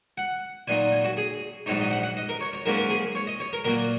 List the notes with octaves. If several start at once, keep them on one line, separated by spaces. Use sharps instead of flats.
F#5
A#2 F#3 D#4 G#5
G#5
F#4
G#4
A#1 G#2 F#3 D#4 C#5
D#5
F#5
F#5
D#5
A#4
C#5
C#5
G#2 F#3 A#3 C#4 A#4
A#4
G#4
C#5
D#5
C#5
A#4
A#2 F#3 A#3 A#4